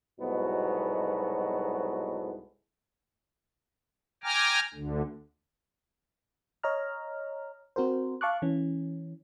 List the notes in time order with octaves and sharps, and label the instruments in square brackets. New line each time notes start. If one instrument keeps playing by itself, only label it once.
[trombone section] C2 G#2 B2 F#3 A3 B3
[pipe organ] G5 G#5 A#5 D6 F6
D2 D3
[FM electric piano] C#5 D#5 A#5 F6
C4 F#4 A#4 C5
F5 A5 C#6 D6 F#6
E3 C#4